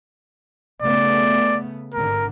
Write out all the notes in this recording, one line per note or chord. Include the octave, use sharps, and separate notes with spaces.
C#3 A3 B3 D5
G#1 D3 A#4